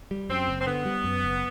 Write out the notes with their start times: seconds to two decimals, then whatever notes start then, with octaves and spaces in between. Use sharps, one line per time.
0.11 G3
0.29 F#2 C4
0.48 F#1
0.61 C4
0.67 D3 B3
0.86 G3
1.04 F#2
1.24 F#1